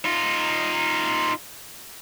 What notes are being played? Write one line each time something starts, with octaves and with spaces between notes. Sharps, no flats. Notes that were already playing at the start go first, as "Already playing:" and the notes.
D#4 F4